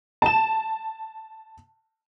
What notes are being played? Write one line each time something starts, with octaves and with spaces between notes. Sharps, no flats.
A5 E7